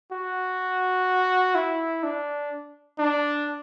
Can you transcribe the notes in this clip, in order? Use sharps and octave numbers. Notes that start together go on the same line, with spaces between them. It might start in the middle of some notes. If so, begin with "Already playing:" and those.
F#4
E4
D4
D4